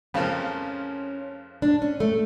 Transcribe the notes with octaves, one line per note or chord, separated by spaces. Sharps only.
F2 C#3 F3 A#3 C#4
D4
C#4
A3